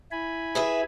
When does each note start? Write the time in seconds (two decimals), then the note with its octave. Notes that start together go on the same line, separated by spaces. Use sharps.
0.12 E4 G#5 B5
0.55 G#4 B4 E5